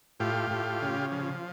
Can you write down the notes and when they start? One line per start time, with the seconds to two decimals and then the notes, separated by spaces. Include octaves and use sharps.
0.20 A2 F4 G4
0.50 A2
0.82 C#3
1.12 F3